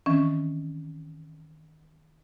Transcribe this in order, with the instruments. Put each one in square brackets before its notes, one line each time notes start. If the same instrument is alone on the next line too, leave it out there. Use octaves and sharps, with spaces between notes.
[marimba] D#3 E3 C4 C#4